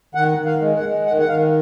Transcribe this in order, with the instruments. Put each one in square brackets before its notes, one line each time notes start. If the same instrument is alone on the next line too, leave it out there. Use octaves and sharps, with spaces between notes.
[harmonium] D#3 F#5
D#3
F5
G#3
F#5
G#3
D#3 F#5
F#5
D#3 F5